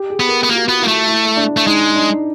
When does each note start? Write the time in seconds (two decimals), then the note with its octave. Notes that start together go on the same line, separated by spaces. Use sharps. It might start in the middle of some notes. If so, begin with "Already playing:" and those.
Already playing: G4
0.10 G#4
0.20 B3
0.29 A#4
0.43 B3
0.48 A#3 F4
0.56 F#4
0.64 B3 F4
0.79 A#3 E4
0.88 A3
1.08 E4
1.37 D4
1.57 A3
1.67 G#3 D#4
1.96 D4